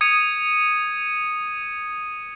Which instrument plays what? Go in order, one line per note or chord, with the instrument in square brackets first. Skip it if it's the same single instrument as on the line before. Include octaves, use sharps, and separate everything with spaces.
[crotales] D#6 G#6 C#7 D#7